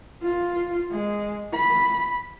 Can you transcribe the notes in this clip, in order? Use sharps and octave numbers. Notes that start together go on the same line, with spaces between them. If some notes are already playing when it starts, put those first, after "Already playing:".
F4
G#3
B5